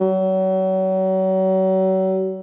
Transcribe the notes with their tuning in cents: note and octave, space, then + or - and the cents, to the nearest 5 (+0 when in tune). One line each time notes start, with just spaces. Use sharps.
F#3 +35